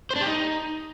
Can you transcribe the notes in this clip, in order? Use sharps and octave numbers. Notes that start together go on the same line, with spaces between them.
C5
D4
G4
D#4